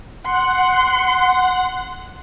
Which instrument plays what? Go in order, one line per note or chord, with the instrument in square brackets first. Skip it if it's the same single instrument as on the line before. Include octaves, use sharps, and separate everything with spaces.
[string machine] F#5 [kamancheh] C6